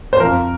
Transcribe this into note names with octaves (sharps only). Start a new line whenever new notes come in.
C5
F2 F3 A#4